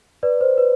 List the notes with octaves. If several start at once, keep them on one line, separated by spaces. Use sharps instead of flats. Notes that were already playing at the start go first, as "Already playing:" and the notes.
B4 D5
C5
B4